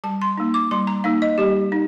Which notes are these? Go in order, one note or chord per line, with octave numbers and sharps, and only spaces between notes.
G3 A5
C6
A#3 D#4
D6
G3 C6
A#5
A#3 D#4 F5
D#5
G3 G4
D#4